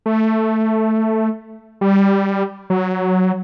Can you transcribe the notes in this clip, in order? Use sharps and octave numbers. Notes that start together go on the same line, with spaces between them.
A3
G3
F#3